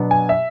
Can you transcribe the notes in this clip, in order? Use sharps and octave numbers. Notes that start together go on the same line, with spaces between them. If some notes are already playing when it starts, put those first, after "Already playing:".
Already playing: B2 F#3 B3 D4
G#5
E5